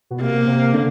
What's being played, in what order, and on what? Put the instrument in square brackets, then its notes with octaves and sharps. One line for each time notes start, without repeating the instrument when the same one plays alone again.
[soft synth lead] B2
[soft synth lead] C3 [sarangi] A#3
[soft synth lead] C3
D3